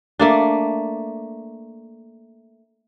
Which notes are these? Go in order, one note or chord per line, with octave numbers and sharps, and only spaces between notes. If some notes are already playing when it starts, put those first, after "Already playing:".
A3 A#3 D4